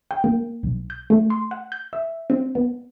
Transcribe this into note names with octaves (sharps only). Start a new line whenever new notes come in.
G5
A#3
B1
G6
A3
C6
F#5
G6
E5
C4
B3